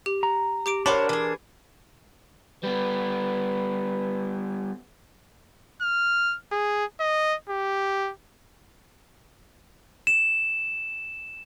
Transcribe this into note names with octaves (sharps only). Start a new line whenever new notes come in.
G4
A#5
G4 D6 D7
D4 A#4 C5 C#5 F#5 B5 C6 D6
E3 G#4
G3 B3 B4
F6
G#4
D#5
G4
E7